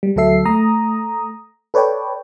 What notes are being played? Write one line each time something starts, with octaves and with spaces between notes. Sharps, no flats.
G3
D2 F#3 A4 E5 C7
A3 A#5 D#6
A4 B4 C#5 D5 G5